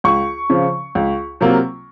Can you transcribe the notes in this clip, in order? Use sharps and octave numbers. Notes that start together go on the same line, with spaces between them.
C#2 C#6
C#3 F3
C#2
C3 F#3 A#3 F4